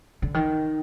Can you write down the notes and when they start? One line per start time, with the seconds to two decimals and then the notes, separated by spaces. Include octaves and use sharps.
0.22 D3
0.34 D#3